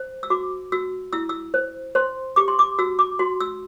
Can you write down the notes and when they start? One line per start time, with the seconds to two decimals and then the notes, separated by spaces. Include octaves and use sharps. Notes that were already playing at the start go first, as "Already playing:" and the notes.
Already playing: C5
0.23 E6
0.30 F#4 D6
0.72 F#4 E6
1.13 E4 E6
1.29 E6
1.54 C5
1.95 C5 C6
2.36 G4 D6
2.48 C6
2.59 D6
2.79 F#4 E6
2.99 D6
3.19 F#4 C6
3.40 E6